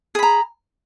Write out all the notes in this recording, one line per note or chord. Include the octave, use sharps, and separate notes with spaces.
G#4 A#5 B5